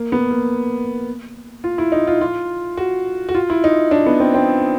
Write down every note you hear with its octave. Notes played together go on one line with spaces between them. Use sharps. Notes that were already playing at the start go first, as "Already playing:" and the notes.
Already playing: A#3
B3
A#3
F4
E4
D#4
F4
F4
F#4
F#4
F4
E4
D#4
D4
B3
C4
C4